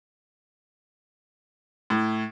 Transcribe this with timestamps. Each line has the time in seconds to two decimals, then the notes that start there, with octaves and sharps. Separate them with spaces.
1.90 A2